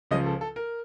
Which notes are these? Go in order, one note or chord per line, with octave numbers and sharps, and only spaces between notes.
C#2 C#3 F3 D#5
A4
A4
A#4